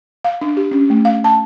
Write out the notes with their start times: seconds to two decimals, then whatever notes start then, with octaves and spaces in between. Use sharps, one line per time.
0.24 F5
0.41 D4
0.57 G4
0.71 C#4
0.90 A3
1.05 F5
1.24 A5